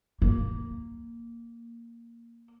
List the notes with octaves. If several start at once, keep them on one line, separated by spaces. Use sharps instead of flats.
A#3